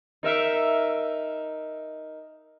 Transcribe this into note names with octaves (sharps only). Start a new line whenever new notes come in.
D#4 A#4 E5